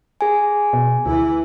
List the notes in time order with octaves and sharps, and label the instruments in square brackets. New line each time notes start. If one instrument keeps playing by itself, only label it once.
[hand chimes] G#4 G#5
[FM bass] B2
[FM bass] D2 [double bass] E3 E4